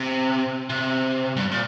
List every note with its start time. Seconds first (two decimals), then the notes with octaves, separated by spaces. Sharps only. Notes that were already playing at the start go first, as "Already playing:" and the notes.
Already playing: C3
0.70 C3
1.37 G2
1.51 A#2